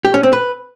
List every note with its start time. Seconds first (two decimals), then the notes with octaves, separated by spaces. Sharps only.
0.05 G4
0.14 C#4
0.23 C4
0.33 B4